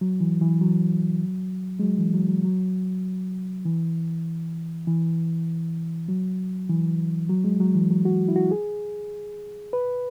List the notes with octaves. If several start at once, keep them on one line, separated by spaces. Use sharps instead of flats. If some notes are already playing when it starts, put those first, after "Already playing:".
F#3
E3
E3
F#3
G#3
F#3
E3
F#3
F#3
F#3
E3
E3
F#3
E3
F#3
G#3
F#3
E3
F#3
F#4
E4
F#4
G#4
B4